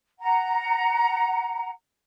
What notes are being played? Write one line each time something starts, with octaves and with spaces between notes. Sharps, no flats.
F#5 A#5